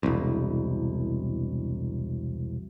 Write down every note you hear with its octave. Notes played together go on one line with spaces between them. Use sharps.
E1 C2